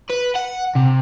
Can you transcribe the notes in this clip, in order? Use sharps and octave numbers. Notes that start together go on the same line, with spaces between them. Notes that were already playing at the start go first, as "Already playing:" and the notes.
B4
F#5
C3